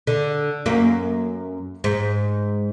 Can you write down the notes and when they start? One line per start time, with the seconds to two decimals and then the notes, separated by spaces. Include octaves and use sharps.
0.07 D3
0.66 F#2 A#3
1.84 G#2